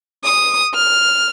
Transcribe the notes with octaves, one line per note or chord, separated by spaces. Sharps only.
D#6
F6